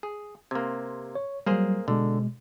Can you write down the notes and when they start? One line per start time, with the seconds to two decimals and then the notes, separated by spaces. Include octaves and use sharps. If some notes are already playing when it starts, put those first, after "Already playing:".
0.03 G#4
0.51 C3 A#3 C6 G#6
1.15 C#5
1.46 F#3 G3 A#3 G#4 C5
1.88 B2 D3 G#3